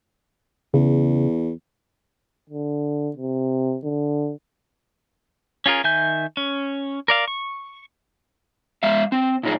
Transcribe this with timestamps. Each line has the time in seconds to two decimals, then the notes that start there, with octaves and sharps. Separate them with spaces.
0.74 E2 C#3
2.50 D3
3.16 C3
3.84 D3
5.66 C#4 F4 G#4 A#4
5.84 D#3 E5 G#5 G6
6.37 C#4
7.08 A#4 D5 F5
7.28 C#6
8.83 G#3 E5 F5
9.12 C4
9.43 A#2 D#4 G#4